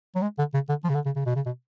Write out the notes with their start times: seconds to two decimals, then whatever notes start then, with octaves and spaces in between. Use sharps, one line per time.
0.15 F#3
0.22 G#3
0.38 D3
0.54 C#3
0.69 D3
0.84 F3
0.89 C#3
0.95 D3
1.05 C#3
1.16 C#3
1.26 B2
1.36 C#3
1.46 B2